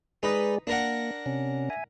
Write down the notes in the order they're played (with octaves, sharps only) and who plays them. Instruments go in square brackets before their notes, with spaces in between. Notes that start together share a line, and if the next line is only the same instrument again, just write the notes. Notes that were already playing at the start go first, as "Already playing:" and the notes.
[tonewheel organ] G#3 G#4 D5 [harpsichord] D#4 B4
[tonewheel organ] A#3 [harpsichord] D4 A#4 F#5
[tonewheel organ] C3 C#4
E5 G#5